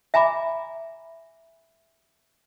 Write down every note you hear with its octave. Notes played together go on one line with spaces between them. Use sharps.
E5 G#5 A#5 B5 D6